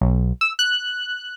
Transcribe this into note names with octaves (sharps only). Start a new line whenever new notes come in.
B1
E6
F#6